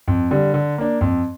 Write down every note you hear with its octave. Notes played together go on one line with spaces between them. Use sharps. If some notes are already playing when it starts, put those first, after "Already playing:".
F2
D3 G3
D3
A#3 D4
F2